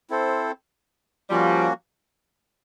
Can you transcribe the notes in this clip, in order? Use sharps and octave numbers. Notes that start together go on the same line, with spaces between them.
C4 E4 A4 C5
F3 G3 A#3 C#4 F#4